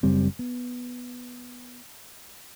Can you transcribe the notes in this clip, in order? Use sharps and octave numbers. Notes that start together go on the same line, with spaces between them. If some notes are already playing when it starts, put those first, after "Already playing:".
F#1 G3 C4
B3